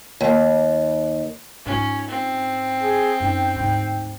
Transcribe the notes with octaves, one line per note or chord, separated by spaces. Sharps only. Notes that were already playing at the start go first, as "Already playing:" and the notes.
D#2
G#2 C#4 F4
C4
G#4
F#2 D#4 G5
D2 G#2